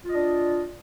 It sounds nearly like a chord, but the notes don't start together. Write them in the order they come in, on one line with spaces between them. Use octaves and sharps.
F4 D#5 D4